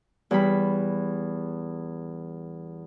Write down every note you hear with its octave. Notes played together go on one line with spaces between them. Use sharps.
E2 G3 B5